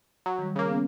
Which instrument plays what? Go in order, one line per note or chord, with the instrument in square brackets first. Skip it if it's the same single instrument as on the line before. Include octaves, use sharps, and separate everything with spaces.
[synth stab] F#3
[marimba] D#3 G3
[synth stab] C#3 A#3
[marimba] B3 C#4